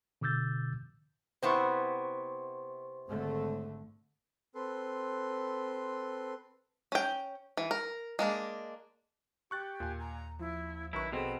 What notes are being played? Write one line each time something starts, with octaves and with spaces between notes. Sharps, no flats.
B2 D3 D6 E6 G6 A6
C3 B3 E4 C5 C6 C#6
G#1 D3 A3
C4 A4 B4 C6
C#4 G5
E3
A#4
G#3 A#3 D4
G4 C#6 F#6 A6
D#2 A#2 G#5
A#5
F3 E4
A#1 F#2 D#3 E4 B4 C#6
B2 C4 G#4 A4 B5